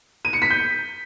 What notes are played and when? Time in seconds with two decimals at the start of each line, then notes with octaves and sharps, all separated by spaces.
0.25 D#7
0.33 C#7
0.42 B6
0.50 G6